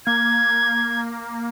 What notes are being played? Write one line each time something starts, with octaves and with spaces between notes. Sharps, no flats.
A#3 G#6